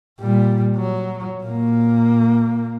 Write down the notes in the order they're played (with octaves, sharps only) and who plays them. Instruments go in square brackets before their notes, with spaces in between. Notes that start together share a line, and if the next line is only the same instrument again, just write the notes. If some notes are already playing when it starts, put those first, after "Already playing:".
[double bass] A#2 G3
F#3
A#2 A#3